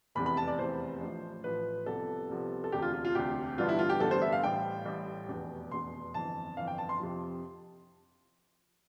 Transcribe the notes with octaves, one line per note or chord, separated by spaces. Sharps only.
F1 E2 C3 E3 B5
B5
A5
D5
F1 E2 C3 E3 C5
A1 A2 F3
A1 A2 F3 B4
C2 C3 F3 B3 A4
C2 C3 F3 B3
A4
E1 D2 C3 G4
F4
F4
F4
E1 D2 C3 G4
A1 G2 D3 G3 B3 F4
E4
F4
G4
A1 G2 D3 G3 B3 A4
C5
E5
F5
A1 A2 G3 G5
A1 A2 G3
F1 E2 B2
F1 E2 B2 C6
G1 F2 E3 A5
G1 F2 E3 F5
G5
A5
C6
F2 C3 F3